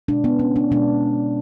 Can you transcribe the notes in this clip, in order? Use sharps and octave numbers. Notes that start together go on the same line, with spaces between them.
B2 G#3 D4
B3
C#4
D4
B2 G#3 D4